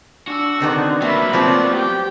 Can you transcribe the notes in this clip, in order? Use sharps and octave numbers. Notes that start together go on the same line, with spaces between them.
D4 F#4 E6
D3 D#3 B3 C4
F#3 A#3 B3 E5 B5
F3 F#3 C4 D5
G4 G5